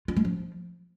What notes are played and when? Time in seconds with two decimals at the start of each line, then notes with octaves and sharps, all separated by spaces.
0.08 F4
0.16 G#3
0.25 F3